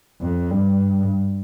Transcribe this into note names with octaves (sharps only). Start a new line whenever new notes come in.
F2
G2